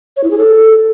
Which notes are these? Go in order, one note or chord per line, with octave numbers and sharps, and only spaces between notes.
C#5
E4
G#4
A4